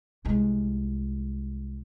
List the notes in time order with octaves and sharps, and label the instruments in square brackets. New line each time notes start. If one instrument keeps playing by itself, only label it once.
[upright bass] C2 G#3